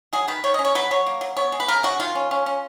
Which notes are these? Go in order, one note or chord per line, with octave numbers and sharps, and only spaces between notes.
F#3 G#4
D#3 B4
D#3 C#5
D#5
C#4
C#5
F#3 B4
F#3 C#5
A#3
F#3
B3 C#5
G#3
B4
C#3 A#4
C#3 F#4
D#3 F4
C#4
C#4
C#4